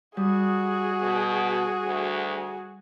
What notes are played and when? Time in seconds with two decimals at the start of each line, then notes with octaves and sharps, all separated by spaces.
0.17 G3 F#4 G#4 D#6
1.02 B2
1.85 D2